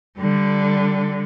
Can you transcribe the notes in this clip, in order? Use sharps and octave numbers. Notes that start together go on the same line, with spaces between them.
D3 G3